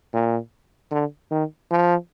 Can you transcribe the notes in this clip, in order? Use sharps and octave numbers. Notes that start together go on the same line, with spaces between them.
A#2
D3
D#3
F3